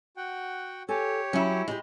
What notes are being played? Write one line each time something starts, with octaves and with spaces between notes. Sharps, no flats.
F#4 F#5 G5
G4 A4 C#5 G#5
F#3 C#4 E4
G#3 E4 F#4 G4